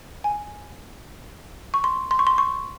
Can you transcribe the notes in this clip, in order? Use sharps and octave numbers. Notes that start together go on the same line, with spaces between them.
G#5
C#6
C6
C6
C#6
C6
C#6